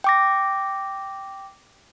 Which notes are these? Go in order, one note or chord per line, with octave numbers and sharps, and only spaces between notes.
G5 D6 A#6